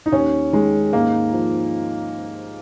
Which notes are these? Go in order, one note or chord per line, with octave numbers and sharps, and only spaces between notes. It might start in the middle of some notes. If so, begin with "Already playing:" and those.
D#4
D#2 C#4
D#3 G#3
G#2 A#3
F3